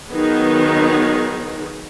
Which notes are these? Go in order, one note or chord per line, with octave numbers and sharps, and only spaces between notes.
D#3 F#3 B3 D#4 G#4